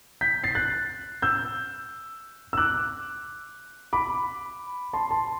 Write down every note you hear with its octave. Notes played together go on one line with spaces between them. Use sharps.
G6 B6
A6 C7
F#6 A6
E6 G6
E6
D6 F#6
B5 D6
A5 C6
A5 C6